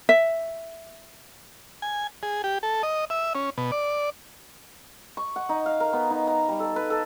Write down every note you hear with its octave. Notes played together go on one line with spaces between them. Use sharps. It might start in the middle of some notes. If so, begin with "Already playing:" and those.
E5
G#5
G#4
G4
A4
D#5
E5
C#4
B2
D5
C#6
F#5
D#4
F5
A#4
B3
D#4
A#5
G3
A4
B4
A4